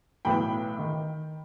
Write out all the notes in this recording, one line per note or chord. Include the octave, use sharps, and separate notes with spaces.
B1 A2 E3 G5 B5
D#3